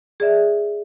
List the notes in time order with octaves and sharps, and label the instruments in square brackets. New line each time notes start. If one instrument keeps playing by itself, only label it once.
[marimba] G#4 D5 E5